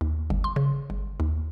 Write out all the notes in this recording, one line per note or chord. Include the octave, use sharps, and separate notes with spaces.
D#2
G1
C6
C#3
G1
D#2